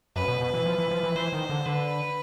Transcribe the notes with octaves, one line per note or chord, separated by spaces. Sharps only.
F#2 B4
B2
B2
E3
F3
E3
F3
E3
E3 C5
D#3
D3
D3 B4